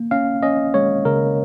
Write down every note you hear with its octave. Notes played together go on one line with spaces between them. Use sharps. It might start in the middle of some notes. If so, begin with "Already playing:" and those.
Already playing: A#3
C#4 F5
C#4 D#5
G#3 C#5
C#3 A#4